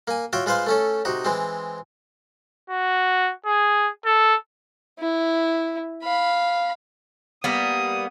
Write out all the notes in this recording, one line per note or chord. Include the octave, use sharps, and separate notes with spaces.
A#3 G#5
F4 F#4 C#5 E5 G5
G#3 F4 B4 C5 F5
A3 C#4 A4
C3 D#4 F#4
E3 G#3 C4
F#4
G#4
A4
E4
F5 B5
G3 A#3 B3 D#6